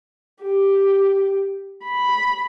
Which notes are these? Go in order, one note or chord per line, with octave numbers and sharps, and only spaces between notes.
G4
B5